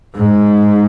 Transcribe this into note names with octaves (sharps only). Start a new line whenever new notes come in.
G#2